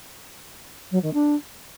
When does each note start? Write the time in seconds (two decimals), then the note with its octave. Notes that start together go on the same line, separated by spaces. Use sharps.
0.91 F#3
1.02 D#3
1.13 D4